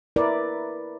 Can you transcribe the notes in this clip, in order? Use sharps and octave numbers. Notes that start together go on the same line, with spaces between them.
E4 A#4 B4 D5